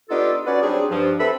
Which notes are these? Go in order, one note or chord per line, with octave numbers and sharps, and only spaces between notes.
B3 D4 D#4 F4 G4 A4
C#4 F#4 B4 D5
F#3 G3 C4 D4 D#4 G#4
G2 F3
C4 A4 B4 E5 B5